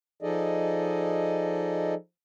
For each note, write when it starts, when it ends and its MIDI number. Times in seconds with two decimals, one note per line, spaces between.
0.22 1.94 53
0.22 1.94 63
0.22 1.94 68
0.22 1.94 69
0.22 1.94 74
0.22 1.94 75